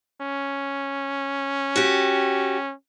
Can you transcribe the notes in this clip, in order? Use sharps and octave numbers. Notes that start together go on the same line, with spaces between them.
C#4
F#4 G4